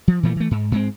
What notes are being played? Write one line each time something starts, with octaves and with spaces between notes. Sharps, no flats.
F3
A#2 E3 F3 A3
E3 A3
G#2
G#2 G#3 C4